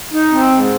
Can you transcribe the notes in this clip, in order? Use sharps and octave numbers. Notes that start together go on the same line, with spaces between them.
D#4
C4
G#2